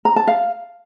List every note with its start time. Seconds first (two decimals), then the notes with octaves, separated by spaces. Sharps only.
0.05 A#5
0.16 A5
0.28 F5